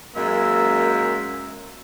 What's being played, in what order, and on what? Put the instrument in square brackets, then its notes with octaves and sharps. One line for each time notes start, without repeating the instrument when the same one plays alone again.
[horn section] F#2 G#3 [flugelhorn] A#3 [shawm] E5